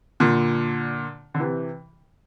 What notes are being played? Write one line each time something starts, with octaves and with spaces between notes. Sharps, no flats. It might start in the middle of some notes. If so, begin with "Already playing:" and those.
A#2 D3
D3
C3 E3